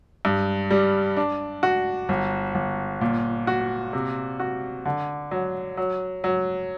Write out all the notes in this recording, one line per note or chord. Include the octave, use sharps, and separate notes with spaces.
G2
G3
D4
F#4
G1
G1
A#2
F#4
C3
F#4
D3
F#3
F#3
F#3